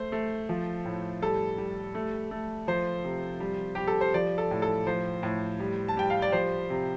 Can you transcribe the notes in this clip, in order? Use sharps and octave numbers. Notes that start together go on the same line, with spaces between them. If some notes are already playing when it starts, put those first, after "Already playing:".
Already playing: A3 C5
A3
F3
A2
G3 A4
G3
A3
A3
F3 C5
C3
G3
G3 G4
A4
C5
F3 D5
A4
A2
A4
F3 C5
A2
G3
A5
G3 G5
F5
D5
F3 C5
C3